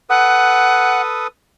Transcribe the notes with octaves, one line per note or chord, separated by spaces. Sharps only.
A4 B4 F#5 D#6